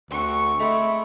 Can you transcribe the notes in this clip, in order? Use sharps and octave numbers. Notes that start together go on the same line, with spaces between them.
D2 C4 F#4 C#6
G#3 A3 C4 E5 B5